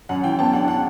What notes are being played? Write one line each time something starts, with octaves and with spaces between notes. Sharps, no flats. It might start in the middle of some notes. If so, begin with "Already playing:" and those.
F#2 F#5
E3 G5
B3 A5
D4 F#5
F#5